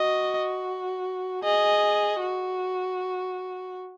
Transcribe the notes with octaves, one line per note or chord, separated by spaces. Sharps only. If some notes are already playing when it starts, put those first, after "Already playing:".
Already playing: F#4 D#5
G#4 D#5
F#4